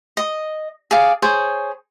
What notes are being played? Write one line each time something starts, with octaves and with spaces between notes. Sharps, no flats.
D#5
G#4 D5 F5
G#4 C5 C#5